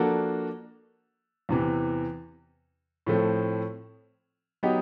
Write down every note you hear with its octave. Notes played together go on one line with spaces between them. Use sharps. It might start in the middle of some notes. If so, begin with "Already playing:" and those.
Already playing: F3 A#3 D4 F#4 A4
E2 C3 E3
A2 F3 A3 C4
F#3 B3 D#4 G4